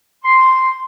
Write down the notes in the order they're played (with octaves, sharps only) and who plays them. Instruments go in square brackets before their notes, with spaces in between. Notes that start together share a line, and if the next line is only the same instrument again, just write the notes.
[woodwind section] C6